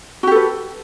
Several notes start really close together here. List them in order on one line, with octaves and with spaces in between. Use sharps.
F#4 G4 A4 B4